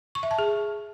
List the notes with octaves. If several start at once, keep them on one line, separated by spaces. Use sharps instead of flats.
C#6
E5
A5
G#4